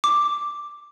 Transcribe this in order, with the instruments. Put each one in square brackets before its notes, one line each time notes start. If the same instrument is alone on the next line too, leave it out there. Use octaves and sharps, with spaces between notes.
[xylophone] D6